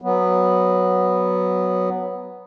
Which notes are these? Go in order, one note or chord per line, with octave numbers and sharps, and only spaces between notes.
F#3 B3